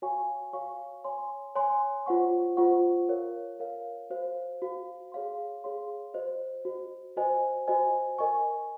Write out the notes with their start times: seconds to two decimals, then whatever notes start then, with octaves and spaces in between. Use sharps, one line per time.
0.02 F#4 C#5 F5 G#5 C#6
0.53 F#4 C#5 F5 G#5 C#6
1.04 C#5 G#5 C6
1.55 C#5 G#5 C6
2.06 F4 C5 F#5 C#6
2.57 F4 C5 F#5 C#6
3.09 A#4 C#5 F5
3.60 A#4 C#5 F5
4.10 F#4 C5 F5
4.62 F#4 C5 F5
5.12 G#4 C#5 F5 C6
5.64 G#4 C#5 F5 C6
6.14 F#4 C5 D#5
6.65 F#4 C5 D#5
7.16 F#4 C5 D#5 G#5
7.67 F#4 C5 D#5 G#5
8.18 A#4 D#5 G#5 C#6